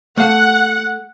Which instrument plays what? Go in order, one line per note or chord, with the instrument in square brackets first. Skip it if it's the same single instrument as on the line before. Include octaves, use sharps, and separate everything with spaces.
[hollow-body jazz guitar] A3 F5 [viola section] F#5